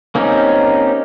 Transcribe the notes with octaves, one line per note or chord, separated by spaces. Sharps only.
A#3 C4 C#4 D#4 G4